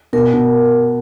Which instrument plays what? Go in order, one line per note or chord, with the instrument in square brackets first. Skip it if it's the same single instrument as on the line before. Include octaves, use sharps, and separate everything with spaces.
[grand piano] B2 [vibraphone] A#4
[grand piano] B2